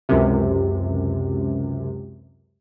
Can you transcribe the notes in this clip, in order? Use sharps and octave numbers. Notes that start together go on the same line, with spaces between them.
C#2 F#2 C3